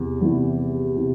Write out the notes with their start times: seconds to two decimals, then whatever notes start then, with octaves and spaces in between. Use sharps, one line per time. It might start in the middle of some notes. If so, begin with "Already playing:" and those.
Already playing: E2 C3
0.21 E2 C3 E3
0.96 C3 E3